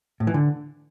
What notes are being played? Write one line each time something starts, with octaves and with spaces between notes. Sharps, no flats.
A2
E3
D3